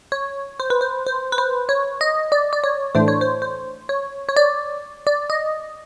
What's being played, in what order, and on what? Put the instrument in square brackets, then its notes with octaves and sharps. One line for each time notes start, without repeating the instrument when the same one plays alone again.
[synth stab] C#5
C5
B4
C5
C5
B4
C5
C#5
D#5
D5
D5
C#5
A2 E3 A3 D4 C5
C#5
C5
C5
C#5
C#5
D5
D5
D#5